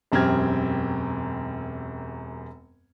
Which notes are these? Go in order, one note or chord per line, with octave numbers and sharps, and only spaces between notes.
E1 F#2 C4 G4 F6 G#6